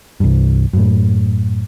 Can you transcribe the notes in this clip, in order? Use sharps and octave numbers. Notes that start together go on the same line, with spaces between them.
C2 G2
F#2 A2